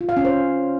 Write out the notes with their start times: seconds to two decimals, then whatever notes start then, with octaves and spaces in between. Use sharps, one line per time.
0.01 F4
0.09 F5
0.17 C#4
0.25 C5